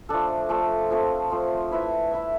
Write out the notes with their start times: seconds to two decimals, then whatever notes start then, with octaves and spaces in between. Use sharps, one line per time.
0.09 F3 A3 D4 A4
0.49 F3 A3 D4 A4
0.90 F3 A3 C4
1.30 F3 A3 C4
1.71 E4 B4 E5
2.11 E4 B4 E5